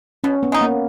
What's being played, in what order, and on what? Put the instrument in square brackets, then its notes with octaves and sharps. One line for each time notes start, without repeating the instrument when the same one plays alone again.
[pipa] B2 [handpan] C#4
[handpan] B3
[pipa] G#3 D#4
[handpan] A#3